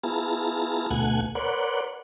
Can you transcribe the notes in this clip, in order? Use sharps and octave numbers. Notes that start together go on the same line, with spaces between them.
B3 E4 F4 G#4 A5 A#5
D2 B2 A3 F#5 G#5
A#4 B4 C#5 D5 F#5 C6